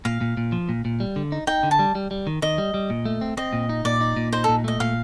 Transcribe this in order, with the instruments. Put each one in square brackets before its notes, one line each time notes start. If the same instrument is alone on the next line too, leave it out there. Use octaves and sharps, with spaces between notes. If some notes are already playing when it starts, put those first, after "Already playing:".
[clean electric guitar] A#2 [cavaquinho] F5
[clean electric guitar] A#2
A#2
F3
A#2
A#2
G3
D3
D#4
[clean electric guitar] D#4 [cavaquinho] G5
[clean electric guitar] D3
[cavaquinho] A5
[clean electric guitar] G3
G3
G3
D#3
[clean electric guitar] D#3 [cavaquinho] D#5
[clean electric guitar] G3
G3
A#2
A3
C4
[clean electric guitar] C4 [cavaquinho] D#5
[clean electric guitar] A#2
D#4
[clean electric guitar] A#2 [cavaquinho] D5
[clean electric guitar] D#4
A#2
[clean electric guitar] D#4 [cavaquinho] C5
[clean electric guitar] A#2 [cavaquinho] A4
[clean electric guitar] A3 [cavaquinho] D#5
[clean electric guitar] A#2 [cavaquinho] F5